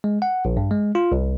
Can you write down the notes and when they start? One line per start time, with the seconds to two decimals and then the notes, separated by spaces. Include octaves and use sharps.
0.04 G#3
0.22 F#5
0.45 A#1
0.57 G2
0.71 G#3
0.95 F4
1.12 C2